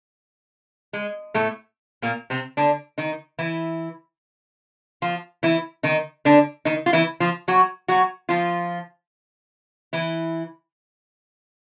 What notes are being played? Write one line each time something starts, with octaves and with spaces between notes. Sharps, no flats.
G#3
A2 A3
A#2 A#3
C3 C4
D3 D4
D#3 D#4
E3 E4
F3 F4
E3 E4
D#3 D#4
D3 D4
D#3 D#4
F4
E3 E4
F3 F4
F#3 F#4
F#3 F#4
F3 F4
E3 E4